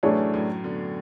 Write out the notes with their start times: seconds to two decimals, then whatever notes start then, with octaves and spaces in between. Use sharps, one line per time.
0.03 F#2 A2 E3 A3 D4 G#4 C#5
0.34 F#2 A2
0.64 B2 D3